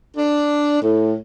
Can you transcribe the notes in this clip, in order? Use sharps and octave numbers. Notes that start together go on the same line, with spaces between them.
D4
A2